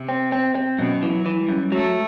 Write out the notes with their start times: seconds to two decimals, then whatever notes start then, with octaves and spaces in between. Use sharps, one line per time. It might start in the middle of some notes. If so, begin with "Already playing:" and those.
Already playing: C3
0.09 C4
0.32 C4
0.55 C4
0.79 F#2 B2
1.03 E3
1.10 F#3
1.26 E3
1.41 G3
1.48 F#2
1.72 F#3 A3